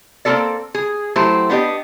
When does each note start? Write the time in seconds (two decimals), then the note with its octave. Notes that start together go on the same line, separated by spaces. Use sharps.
0.25 A#3 C4 F4 G4 A4 D5
0.74 G#4
1.16 F#3 A3 E4 G4 C5
1.49 B3 D4 G4 D#5